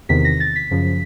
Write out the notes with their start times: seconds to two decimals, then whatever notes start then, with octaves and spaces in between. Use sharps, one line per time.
0.09 E2 C3 D#3 B6
0.25 A#6
0.40 A6
0.56 B6
0.71 F#2 C#3 F3